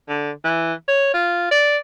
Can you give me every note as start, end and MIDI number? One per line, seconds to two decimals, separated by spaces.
0.09 0.31 50
0.44 0.73 52
0.88 1.10 73
1.14 1.47 65
1.51 1.77 74